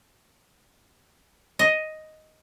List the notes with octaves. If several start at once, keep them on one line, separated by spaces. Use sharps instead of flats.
D#5